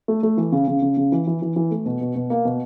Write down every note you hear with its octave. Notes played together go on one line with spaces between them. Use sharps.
A3
A3
E3
C#3
C#3
C#3
C#3
E3
E3
E3
E3
A3
B2
B2
B2
A#3
B2